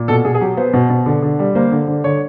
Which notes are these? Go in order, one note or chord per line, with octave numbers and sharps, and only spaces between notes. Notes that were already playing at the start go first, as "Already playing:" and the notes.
Already playing: A#2
B2 A4
B2 G#4
G#4
F#3 G4
B3 C5
B2
B2
D3
D3
G3
A#3 C5
D3
D3
D3 C#5